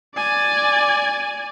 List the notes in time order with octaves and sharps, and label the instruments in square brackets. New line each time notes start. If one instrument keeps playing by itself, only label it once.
[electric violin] D5 G#5